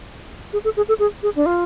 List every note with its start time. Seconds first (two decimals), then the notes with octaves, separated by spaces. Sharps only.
0.53 G#4
0.64 A4
0.77 G#4
0.89 A4
0.99 G#4
1.23 G#4
1.36 D4
1.46 F4